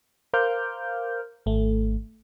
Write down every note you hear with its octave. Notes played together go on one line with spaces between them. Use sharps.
A#4 C5 F5 D6 F6 G6
G#1 A3